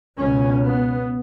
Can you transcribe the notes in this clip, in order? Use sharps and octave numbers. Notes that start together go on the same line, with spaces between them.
C#2 B2 C#4
B3